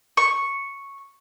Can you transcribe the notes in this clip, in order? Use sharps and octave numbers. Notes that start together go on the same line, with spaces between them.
C#6